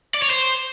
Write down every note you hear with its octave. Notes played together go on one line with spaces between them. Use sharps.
D5
C#5
C5